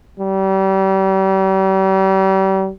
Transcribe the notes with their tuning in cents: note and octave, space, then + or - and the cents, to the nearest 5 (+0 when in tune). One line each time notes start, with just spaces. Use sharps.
G3 -35